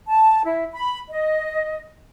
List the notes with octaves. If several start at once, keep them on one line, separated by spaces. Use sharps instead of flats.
A5
E4
B5
D#5